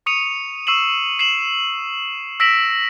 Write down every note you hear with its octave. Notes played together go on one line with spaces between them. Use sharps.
C#6 D#6 C#7 D#7 F7
C#6 E6 C7 D#7 E7 F#7
C7 E7 F#7
E6 A#6 B6 D7 E7 F#7